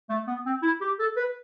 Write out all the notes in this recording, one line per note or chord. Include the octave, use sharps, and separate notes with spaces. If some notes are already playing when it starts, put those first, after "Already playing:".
A3
B3
C4
E4
G4
A4
B4